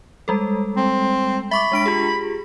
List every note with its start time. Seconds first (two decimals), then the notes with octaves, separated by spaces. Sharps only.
0.28 G3 G#3 A4
0.77 C4
1.51 E5 B5 C#6 D6
1.72 G#3 D4 D7
1.86 F4 G4 G#4